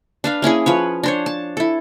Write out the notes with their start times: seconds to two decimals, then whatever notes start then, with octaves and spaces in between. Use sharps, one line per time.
0.24 D4 B4 F5
0.42 A#3 C#4 E4 G#4
0.66 F3 B4 C#5
1.03 D4 C5 C#5
1.26 A5
1.57 E4 A4